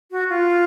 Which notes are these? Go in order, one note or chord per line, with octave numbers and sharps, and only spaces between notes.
F#4
F4